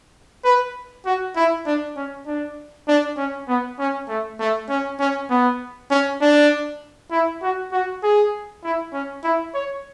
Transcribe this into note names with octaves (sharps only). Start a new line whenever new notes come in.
B4
F#4
E4
D4
C#4
D4
D4
C#4
B3
C#4
A3
A3
C#4
C#4
B3
C#4
D4
E4
F#4
F#4
G#4
E4
C#4
E4
C#5